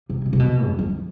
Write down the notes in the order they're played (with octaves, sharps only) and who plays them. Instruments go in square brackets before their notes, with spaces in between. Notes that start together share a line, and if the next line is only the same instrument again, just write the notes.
[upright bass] C3
B2
C3
B2
E2
F2